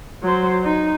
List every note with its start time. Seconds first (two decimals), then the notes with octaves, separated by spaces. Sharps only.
0.23 F#3 C5
0.63 D#4